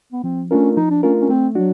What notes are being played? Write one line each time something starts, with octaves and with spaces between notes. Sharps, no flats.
B3
F3 C4
A3 C#4 D4 F4 A#4
F3 D#4
D4
A3 C#4 D4 F4 A#4
C#4
A3 C4
F#3 D4 F#4